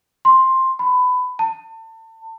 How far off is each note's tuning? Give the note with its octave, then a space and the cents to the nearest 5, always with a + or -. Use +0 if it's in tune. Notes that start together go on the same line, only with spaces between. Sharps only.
C6 +5
B5 +20
A5 +30